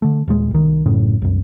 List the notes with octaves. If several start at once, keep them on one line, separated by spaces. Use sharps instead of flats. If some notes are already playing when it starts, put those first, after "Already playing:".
D3 A3
D#1 A#2 G#3
C2 D#3
A1 F#2 A2 C#3
C2 F#2